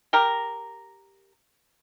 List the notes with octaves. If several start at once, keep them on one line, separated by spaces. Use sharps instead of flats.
G4 A#4